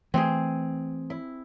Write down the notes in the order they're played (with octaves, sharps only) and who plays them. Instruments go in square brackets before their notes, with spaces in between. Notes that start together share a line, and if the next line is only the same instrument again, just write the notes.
[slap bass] E3 A3 [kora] C4 G#4
[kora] E4